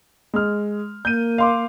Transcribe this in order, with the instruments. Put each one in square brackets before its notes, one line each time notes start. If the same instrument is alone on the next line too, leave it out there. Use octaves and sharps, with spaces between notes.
[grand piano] G#3 F6
[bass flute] A#3 [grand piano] G6 D#7
[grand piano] F5 C6 D6